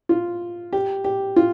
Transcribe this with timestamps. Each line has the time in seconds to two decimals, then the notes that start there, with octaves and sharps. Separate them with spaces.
0.09 F4
0.73 G4
1.04 G4
1.36 F4